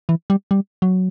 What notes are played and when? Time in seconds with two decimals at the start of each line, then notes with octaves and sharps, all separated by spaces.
0.09 E3
0.30 G3
0.51 G3
0.82 F#3